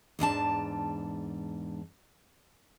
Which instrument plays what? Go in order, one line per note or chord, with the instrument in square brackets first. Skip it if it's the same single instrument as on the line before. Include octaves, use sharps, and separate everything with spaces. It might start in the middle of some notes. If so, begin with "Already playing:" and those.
[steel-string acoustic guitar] E2 G#2 D4 A5